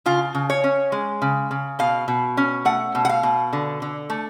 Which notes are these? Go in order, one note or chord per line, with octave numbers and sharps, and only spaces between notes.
C#3 F4
C#3
C#5
C#4
G#3
C#3
C#3
B2 F5
B2
C#4
A3 F#5
B2
F#5
F5
B2
D3
D3
A3